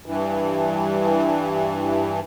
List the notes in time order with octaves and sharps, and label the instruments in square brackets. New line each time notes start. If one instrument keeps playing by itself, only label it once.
[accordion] G2 E3